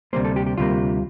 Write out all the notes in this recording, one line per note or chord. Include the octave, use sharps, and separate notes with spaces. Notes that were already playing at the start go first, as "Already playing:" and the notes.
D2 C3 G3 A#3 C5
A4
G4
G4
D2 C3 G3 A#3 F4